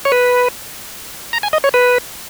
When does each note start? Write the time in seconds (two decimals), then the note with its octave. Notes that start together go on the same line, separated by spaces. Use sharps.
0.05 C#5
0.12 B4
1.33 A#5
1.43 G#5
1.53 D#5
1.64 C#5
1.74 B4